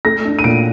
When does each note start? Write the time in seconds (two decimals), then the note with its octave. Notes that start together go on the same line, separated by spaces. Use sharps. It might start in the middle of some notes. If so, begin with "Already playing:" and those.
0.05 A3 A#6
0.25 D4
0.39 D#7
0.44 A#2 D7